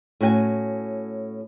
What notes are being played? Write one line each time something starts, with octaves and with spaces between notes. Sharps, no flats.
A2 C#4 F#4 G5 G#5